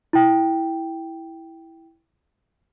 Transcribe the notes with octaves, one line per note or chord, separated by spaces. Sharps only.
E4 G5